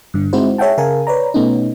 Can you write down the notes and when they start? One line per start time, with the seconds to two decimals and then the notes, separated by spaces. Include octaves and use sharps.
0.14 G2 D3
0.33 G#3 C4 D#4 E4 F#4 C5
0.58 G#4 C#5 E5 F#5 G5 A5
0.78 C#3 G#4 A#4 F5 G#5 A5
1.07 B4 C#5 D5 A#5
1.34 B2 A3 B3 C#4 D#4